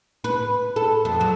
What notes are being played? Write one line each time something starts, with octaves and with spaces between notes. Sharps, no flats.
B4
A4
F2
F#3